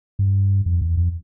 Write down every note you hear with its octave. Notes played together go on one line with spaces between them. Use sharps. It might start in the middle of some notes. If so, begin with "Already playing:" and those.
G2
F2
E2
F2